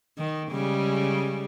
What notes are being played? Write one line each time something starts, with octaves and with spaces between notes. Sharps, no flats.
D#3
C#3 G3 G#3